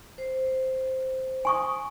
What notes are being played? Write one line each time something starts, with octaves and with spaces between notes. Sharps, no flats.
C5
G#5 C#6 D#6